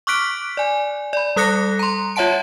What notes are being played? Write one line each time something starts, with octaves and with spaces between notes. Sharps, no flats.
C#6 D6 F6 F#6 B6 D7
D5 G#5
D5 B5
G3 A4 D#6 F#6 A#6 C#7
A#5 C6
F4 C#5 E5 F#5 A5 D7